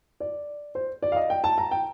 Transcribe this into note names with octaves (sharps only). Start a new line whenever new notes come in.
D5
C5
D5
F5
D#5
G5
A5
A#5
G5